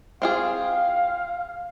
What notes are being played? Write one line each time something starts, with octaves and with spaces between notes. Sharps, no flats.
C4 F4 G#4 F5